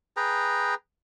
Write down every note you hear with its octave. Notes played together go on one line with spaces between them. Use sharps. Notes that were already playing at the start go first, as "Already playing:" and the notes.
G#4 B4 G5 A#5